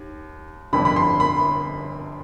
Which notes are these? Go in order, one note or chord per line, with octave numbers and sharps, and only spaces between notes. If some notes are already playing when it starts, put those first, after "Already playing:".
Already playing: D#2
G1 F2 D3 B5
B5
C6
B5